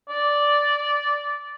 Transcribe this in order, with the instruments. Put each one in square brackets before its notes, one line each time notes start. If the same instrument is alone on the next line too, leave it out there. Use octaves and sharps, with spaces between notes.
[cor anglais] D5